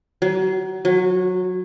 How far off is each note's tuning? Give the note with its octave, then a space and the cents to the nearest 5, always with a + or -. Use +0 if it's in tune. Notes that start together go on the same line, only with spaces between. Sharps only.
F#3 +30
F#3 -20